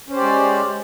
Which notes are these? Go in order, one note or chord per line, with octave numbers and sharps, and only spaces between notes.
G#3 C#4 G4 C5 D5